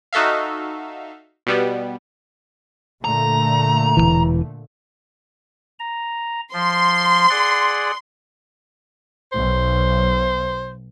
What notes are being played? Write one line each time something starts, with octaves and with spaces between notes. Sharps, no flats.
D#4 F#4 A4 E5 F5
B2 G3 B3
A#2 D3 A3 A#5
E1 C2 E3
A#5
F3 C6
G#4 D5 F#5
B1 C5